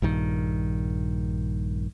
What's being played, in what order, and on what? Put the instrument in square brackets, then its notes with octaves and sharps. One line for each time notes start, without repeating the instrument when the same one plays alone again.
[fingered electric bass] A#1 G2 D#3